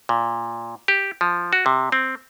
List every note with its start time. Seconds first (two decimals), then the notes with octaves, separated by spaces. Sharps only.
0.09 A#2
0.88 G4
1.21 F3
1.53 F#4
1.66 C3
1.92 C4